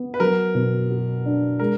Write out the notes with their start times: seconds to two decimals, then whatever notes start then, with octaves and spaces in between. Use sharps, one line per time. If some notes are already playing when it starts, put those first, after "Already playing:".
Already playing: B3
0.14 B4
0.20 F#3 A#4
0.55 B2
0.91 F#4
1.26 D4
1.59 G#3 A#4